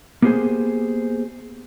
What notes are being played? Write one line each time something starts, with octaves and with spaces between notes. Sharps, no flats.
A#3 B3 G4 G#4 C5 G#5